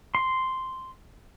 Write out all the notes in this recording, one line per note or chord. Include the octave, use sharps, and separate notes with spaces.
C6